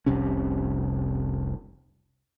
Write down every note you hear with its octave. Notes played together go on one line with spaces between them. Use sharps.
F1 C2 C3 C#4